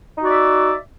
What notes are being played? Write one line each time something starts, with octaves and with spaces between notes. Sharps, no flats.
D#4 F#4 D5 E5